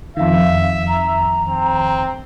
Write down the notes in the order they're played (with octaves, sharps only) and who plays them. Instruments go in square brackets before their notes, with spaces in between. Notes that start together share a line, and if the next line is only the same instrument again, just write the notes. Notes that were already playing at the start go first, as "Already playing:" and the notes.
[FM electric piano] F2 D#3 [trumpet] E5 [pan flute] F5
[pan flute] A#5
[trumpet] C4